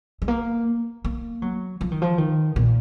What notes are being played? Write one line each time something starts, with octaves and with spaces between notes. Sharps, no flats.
G#3
A#3
A#3
F#3
F3
D#3
F3
D#3
A#2